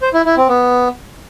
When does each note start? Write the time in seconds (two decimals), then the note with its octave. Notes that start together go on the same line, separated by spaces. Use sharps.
0.02 C5
0.14 E4
0.25 E4
0.37 C4
0.49 B3